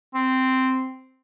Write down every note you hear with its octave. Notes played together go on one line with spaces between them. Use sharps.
C4